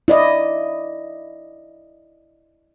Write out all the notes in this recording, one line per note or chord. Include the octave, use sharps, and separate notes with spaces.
E4 D5 D#5